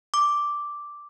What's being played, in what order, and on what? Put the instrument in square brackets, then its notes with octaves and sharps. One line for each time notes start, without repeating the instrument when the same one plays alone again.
[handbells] D6